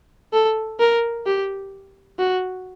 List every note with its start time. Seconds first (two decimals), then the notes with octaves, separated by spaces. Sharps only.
0.33 A4
0.80 A#4
1.26 G4
2.18 F#4